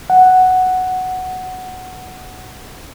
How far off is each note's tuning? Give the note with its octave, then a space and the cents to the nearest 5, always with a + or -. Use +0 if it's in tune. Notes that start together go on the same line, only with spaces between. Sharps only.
F#5 +0